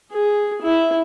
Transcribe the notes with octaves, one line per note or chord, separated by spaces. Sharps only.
G#4
E4